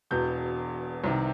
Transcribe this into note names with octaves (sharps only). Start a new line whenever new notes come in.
E1 E2 B2 G6
C2 C3 D#3